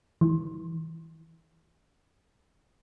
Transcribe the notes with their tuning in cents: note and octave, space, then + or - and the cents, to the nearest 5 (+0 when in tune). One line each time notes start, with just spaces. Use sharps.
E3 -25